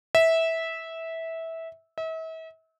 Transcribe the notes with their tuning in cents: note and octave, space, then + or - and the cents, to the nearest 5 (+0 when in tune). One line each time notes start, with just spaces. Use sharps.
E5 -15
E5 -40